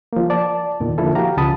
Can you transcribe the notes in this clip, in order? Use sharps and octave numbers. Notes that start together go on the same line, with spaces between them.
F3 A#3
D5 A5
E2 A#2 D#3
D3 F3 A#3 E4 A4
F#4 G4 F5 A#5
C#2 C#3 F3 A5 B5 D#6